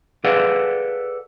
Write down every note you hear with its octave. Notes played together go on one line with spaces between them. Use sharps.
G#4 A4 B4 D5 F5 F#5